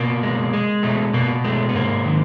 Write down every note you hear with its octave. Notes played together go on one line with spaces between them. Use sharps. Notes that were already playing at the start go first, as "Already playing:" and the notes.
Already playing: B2 A#3
G#3
G#3
B2 A3
B2 A#3
G#3 A3
B3
G#2 A#3
D#3